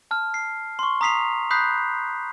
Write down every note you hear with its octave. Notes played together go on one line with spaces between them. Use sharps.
A5 F6
C7
C6 C#6
A#5 D#6 B6 C7 F7
B5 D#6 F#6 G6 B6 C7